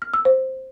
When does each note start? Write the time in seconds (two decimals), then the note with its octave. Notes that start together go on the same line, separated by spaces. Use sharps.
0.02 F6
0.14 E6
0.25 C5